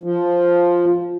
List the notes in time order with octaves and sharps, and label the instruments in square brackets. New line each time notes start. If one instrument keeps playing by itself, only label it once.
[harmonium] F3